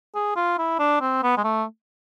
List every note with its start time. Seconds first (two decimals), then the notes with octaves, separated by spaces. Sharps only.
0.15 G#4
0.36 F4
0.58 E4
0.79 D4
1.01 C4
1.23 B3
1.37 G#3
1.44 A3